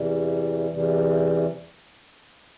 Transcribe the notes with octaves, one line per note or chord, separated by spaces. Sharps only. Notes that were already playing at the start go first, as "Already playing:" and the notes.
Already playing: E2 C3 E3 G3
E2 C3 E3 G3